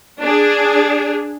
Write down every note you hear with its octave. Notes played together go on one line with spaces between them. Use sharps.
D4 G#4